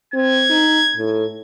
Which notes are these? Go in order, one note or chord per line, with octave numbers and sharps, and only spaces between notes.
C4 G#6
D#4
A2